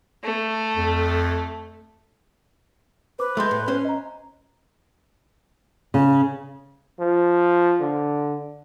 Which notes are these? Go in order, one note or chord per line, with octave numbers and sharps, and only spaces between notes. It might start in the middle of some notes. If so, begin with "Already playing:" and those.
A3
F2
B4 C5 D6
G#3 A3 A4 C6 G6
A2
C#4 C5
D#5 A#5
C#3
F3
D3